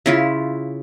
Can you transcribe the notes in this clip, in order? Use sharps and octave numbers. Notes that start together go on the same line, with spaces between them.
C#3 E4 F4